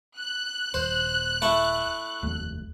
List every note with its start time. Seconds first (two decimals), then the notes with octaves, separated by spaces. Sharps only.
0.18 F#6
0.74 D#1 C5
1.42 A3 E4 A4
2.22 F1 D#2 A3